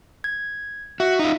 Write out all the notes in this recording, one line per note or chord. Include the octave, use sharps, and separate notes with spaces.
G#6
F#4 E5
D#4 F4